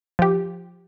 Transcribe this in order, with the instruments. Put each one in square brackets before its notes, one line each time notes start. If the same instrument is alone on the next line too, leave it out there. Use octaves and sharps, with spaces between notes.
[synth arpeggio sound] F3 G4